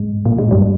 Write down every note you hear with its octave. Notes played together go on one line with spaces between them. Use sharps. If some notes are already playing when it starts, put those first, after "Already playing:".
Already playing: G#2 G#3
A#2 A#3
G#2 G#3
G2 G3